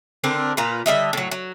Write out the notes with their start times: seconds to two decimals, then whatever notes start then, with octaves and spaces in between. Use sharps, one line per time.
0.24 D3 C4 D4 A#4
0.57 A#2 F4 B4 A#5
0.86 D3 G3 D#5 E5
1.13 A2 F#3
1.31 F#3